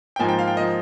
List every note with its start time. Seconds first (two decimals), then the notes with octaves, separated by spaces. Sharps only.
0.16 G5
0.19 G#2 F3 A#3 G#5
0.29 G5
0.39 F5
0.48 G5
0.56 F3 A#3 D#5